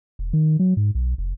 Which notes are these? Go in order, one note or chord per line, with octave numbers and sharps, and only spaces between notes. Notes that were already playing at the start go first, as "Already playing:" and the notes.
E1
D#3
F#3
G#2
B1
F1